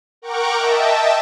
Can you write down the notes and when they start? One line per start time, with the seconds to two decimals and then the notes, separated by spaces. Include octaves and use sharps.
0.22 A#4 F#5 G5 A#5 C#6 D6
0.59 D#5 E5 G5 A5